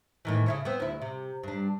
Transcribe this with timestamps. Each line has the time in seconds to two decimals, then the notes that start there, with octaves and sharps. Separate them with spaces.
0.25 A2 D#3 E3
0.46 C#3 E4 C#5
0.65 B3 C4
0.80 D2 E4
1.02 C3
1.43 G2 D4